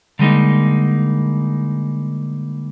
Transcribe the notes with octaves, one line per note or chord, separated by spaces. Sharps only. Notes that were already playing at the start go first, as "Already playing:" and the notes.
D3 G3 G#3 A#3 D#4